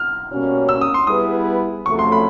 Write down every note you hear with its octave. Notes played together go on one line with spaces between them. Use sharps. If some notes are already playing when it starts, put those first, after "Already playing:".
Already playing: F6
B2 G3 A#3 C#4 F#4
E6
D#6
C6
G3 B3 E4 G#4 B4 D#6
F2 C#3 F#3 A3 C#6
C6
B5